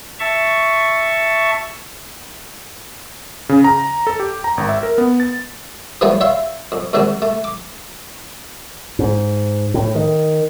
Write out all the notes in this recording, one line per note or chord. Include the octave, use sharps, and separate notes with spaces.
E5 A5 C#6
C#3
A#5
A4
G4
A#5
G#1
E5
A#4
B3
A6
E3 F3 G3 A3 B3 C#5
C#5 E5 F5 C6
F2
D#2 G#2 D#3 F#3 G#3 C4
A3
D6
G#2
A2
D#3